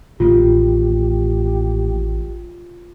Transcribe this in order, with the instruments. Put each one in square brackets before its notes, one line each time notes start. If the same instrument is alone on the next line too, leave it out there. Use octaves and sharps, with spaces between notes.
[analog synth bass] A1 [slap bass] A2 D#3 A#3 [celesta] F4 [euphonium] G4